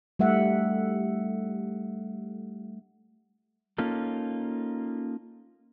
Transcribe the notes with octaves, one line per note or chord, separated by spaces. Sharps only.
G3 A3 E5 F#5
A#3 C#4 D#4 F4 A4